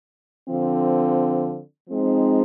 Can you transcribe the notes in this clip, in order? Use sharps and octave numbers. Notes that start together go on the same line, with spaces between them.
D3 F3 C4
F3 G#3 C4 D#4